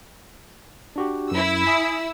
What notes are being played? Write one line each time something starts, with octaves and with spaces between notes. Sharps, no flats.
D4 F#4 G4
F#2 E4 E6
G#5 D#6 B6